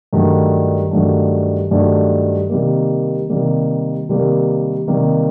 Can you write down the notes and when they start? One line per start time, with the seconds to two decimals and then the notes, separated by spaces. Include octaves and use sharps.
0.13 G2 D#3 F#3 A3 D4
0.91 G2 D#3 F#3 A3 D4
1.71 G2 D#3 F#3 A3 D4
2.50 C3 D#3 G3 A#3
3.29 C3 D#3 G3 A#3
4.09 C3 D#3 G3 A#3
4.87 C3 D#3 G3 A#3